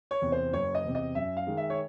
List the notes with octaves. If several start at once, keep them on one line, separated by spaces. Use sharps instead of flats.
C#5
E2 C3
C5
F#1 C#5
D#5
E2 C3
D#5
F#2 E5
F5
D#3 G#3
E5
C#5